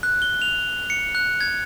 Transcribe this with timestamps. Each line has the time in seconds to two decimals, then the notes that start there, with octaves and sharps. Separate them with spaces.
0.03 F#6
0.22 G7
0.42 F7
0.90 C#7
1.15 F#6
1.41 G#6